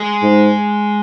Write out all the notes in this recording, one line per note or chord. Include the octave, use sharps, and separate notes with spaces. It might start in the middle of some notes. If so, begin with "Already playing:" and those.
Already playing: G#3 G#4
G#2